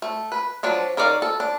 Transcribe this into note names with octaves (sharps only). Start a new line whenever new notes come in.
A3
B4
F3 F#3 D4
D#3 A#4 C#5 D5 F5
A4
D4